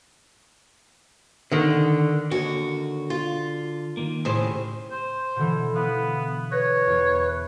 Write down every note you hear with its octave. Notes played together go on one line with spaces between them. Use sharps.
D3 D#3
D#2 D3 F#4
F4
D#3 A#3
A2 C#3 G4 G#4 C5
C5
B2 D3 E3
B3 E4 F5
B4 C#5 A#6
E2